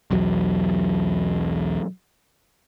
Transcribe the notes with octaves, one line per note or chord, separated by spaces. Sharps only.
B1 E2 F#3